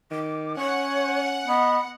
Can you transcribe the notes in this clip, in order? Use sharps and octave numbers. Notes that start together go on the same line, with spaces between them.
D#3 D6
C#4 C#5 F#5
B3 D#5